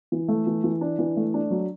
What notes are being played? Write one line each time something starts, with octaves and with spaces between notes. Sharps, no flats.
E3
A3
E3
E3
D4
E3
A3
D4
F#3